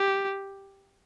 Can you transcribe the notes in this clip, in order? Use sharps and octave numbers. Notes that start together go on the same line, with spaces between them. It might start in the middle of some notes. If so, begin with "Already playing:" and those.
Already playing: G4